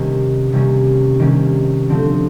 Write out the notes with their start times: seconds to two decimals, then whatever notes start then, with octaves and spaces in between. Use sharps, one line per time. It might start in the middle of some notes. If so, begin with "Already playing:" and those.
Already playing: C3 D#3 G3 A#3 C#4
0.52 C3 D#3 G3 A#3 C#4
1.19 C3 D#3 G3 A#3 C#4
1.89 D3 F3 A3 C4